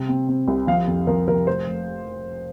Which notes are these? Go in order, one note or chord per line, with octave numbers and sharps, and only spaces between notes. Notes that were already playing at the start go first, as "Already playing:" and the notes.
Already playing: C3 G3
C4
C4
C2
F3 F5
F2
F3 A#4
F3 A#4
F1 C5
F1